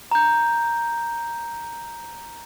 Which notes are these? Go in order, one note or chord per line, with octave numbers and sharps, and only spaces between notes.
A#5 G6